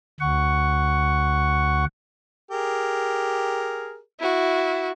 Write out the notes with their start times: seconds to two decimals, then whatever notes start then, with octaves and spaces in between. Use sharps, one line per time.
0.20 D2 F#5 C#6
2.51 G4 G#4 A#4
4.20 E4 F#4